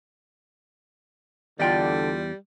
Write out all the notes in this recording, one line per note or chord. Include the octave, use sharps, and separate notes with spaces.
E2 D3 G3 F4 D5 D#5 G5